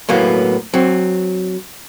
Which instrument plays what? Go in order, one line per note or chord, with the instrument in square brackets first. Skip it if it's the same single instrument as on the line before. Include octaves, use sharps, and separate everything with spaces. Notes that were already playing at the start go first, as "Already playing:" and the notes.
[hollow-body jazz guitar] A2 F#3 A#3 B3
F#3 C4